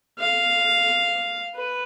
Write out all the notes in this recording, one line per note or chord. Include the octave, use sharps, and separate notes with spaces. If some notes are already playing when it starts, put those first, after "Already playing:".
F5
B4